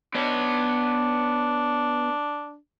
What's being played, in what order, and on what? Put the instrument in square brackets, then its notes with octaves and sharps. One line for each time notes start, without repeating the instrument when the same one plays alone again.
[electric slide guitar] B3 B4 C#5 [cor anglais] D4